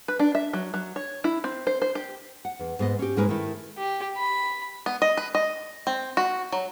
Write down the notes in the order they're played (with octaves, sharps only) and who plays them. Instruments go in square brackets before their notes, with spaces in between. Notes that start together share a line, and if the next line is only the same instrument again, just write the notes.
[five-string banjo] B4
D4
E5
F#3
F#3
C#5
E4
C4
C5
C5
G4
[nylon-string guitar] F#5
E2
G#2 B3 D#5
C#4 G4
G#2 G#3 D#4 A#4 B4 G#5
D#3 A3 E4
[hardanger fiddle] G4
B5
[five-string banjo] B3
D#5
B4
D#5
C4
F#4
F#3